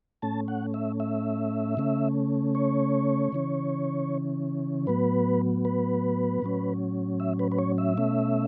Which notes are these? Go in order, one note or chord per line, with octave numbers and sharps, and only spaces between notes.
A2 A3 C#4 A5
F#5
E5
E5
C#3 A3 C#4
C#5
C#3 E3 C#4
A2 F#3 B3 B4
B4
A2 F#3 C#4
E5
B4
B4
C#5
E5
B2 A3 C#4